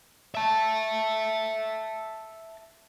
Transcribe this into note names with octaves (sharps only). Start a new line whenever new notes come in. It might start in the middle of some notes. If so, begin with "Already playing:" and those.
E5 A5